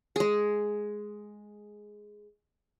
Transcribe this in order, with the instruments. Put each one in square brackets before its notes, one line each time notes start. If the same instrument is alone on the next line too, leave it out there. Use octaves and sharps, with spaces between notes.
[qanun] G#3 G#4